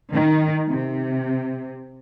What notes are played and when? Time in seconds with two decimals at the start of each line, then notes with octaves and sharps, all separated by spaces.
0.12 D#3
0.71 C3